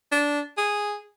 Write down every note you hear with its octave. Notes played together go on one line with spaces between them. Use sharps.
D4
G#4